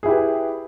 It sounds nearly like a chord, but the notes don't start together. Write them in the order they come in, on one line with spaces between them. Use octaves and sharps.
G#4 E4 G4 B4